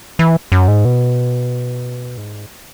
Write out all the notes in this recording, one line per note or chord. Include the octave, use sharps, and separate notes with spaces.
E3
F#2
G#2
B2
G#2